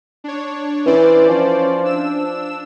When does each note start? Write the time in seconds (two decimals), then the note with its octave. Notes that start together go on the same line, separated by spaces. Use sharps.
0.24 D4 C#5
0.86 E3 C#4 C5 D5
1.29 F3
1.84 D4 E6 E7